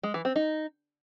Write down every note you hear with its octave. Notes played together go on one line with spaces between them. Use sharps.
G#3
E3
C4
D#4